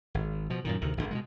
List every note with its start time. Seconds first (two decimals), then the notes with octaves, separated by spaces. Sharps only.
0.14 G#1
0.50 B2 F3
0.65 F#2 A#2 D#3
0.81 D2 C3 D#3
0.97 G#1 G#2 B2 D3
1.11 B2 D3 G#3